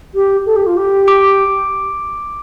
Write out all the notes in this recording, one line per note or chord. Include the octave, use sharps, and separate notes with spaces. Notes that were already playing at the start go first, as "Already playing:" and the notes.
G4
A4
G4
F4
G4
D6 D7